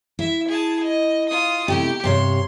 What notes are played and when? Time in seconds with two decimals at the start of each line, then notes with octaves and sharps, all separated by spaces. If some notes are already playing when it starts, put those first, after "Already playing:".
0.19 E4 E5
0.48 G#4 A5
0.83 D#5
1.29 F4 D#6
1.68 C3 A3 E4 G4
2.04 G2 C3 C#5 C6